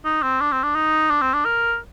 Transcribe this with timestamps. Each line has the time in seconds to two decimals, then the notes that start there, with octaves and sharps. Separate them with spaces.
0.05 D#4
0.22 C4
0.40 D4
0.52 C4
0.63 D4
0.75 D#4
1.10 D4
1.21 C4
1.34 D4
1.45 A#4